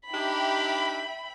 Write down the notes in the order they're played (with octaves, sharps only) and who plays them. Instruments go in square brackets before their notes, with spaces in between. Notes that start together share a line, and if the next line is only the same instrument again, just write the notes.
[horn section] D4 D#4 G4 [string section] E5 G5 B5